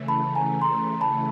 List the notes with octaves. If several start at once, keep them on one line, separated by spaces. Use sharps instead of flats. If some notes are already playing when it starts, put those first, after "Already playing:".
Already playing: C#3 E3 A3
A5 B5
G#5 A#5
A#5 C6
A5 B5